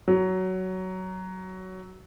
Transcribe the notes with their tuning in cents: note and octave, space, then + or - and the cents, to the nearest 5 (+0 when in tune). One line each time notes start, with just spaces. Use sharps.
F#3 +15